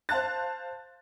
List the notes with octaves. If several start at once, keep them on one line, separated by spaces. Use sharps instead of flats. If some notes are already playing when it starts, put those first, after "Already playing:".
C5 F5 A5 F#6 A6